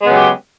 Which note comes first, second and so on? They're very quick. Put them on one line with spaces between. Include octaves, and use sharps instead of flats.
G#3 B3 C#3 F#3 G4